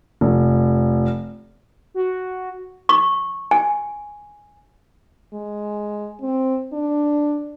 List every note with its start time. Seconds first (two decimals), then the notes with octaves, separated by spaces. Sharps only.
0.21 F1
1.94 F#4
2.89 C#6
3.51 G#5
5.34 G#3
6.22 C4
6.73 D4